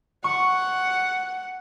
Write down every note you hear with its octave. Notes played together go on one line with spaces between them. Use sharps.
F#5 C#6